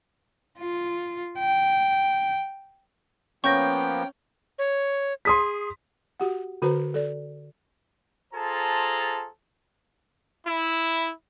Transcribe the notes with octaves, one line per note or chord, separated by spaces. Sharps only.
F4
G5
F3 A#3 B3 C#4 G5 C#6 G6 A#6
C#5
G#4 C6 D#6 B6
F#4 G4 F#5
D3 F#4 B4 C5 A#5
A4 D5
F4 G#4 A4 C5 A5 A#5
E4